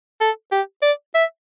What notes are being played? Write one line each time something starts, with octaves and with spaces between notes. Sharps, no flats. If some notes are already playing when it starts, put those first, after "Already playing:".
A4
G4
D5
E5